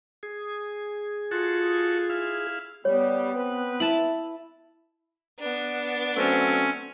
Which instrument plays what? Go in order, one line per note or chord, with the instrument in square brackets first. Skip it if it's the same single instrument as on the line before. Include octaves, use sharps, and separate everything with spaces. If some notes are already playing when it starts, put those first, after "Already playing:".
[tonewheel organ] G#4
[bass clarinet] F4 [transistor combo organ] F#4 A4
[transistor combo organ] E4 F5
[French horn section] G3 [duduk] B3 [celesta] C#5
[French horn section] C4 B4
[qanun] E4 A5 [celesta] F#7
[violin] B3 D4
[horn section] F#3 A3 C4 [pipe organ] C#4